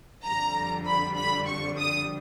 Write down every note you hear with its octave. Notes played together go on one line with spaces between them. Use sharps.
F2 D3 G3 A#5
B5
B5
C#6
D#6